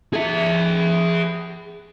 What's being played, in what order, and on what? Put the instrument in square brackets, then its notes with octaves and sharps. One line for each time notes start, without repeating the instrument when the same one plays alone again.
[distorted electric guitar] G#4 E5